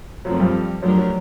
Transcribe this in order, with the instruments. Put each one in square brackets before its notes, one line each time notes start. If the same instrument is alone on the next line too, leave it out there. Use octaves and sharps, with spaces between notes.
[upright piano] F#2 F#3 [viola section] F3 A3 C4
[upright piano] G2 G3
[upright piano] F#2 F#3 [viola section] F3 A3 D4 G4 A#4
[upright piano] F#3